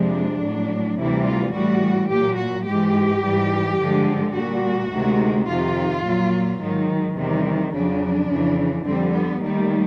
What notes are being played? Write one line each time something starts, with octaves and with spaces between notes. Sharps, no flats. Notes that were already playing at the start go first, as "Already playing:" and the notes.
Already playing: F2 C3 F3 G#3 D4
A2 F#3
D2 C3 E3 G3 E4
F4
A2 E3 G3 F#4
A#2 F#3 G4
F#4
G#2 E3 G#3 G4
G#2 E3 G3
G2 D3 F3 G#3
A#2 G3 F#4
D2 C3 D#3 G#3
F2 C3 D#3 F4
A#2 F#3
G#2 D#3 F#3
E2 C3 D#3 G3
F2 C#3 F#3 D4
F2 C#3 E3
F2 D3 G3 C4
B3
D#2 D#3 G3 A3